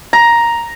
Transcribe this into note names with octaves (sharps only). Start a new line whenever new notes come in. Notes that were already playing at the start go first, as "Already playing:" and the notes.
A#5